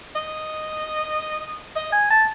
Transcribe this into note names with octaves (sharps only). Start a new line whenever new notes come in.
D#5
D#5
G#5
A5